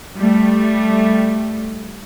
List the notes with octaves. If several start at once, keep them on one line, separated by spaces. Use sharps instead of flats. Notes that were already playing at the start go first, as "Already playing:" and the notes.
G3 A3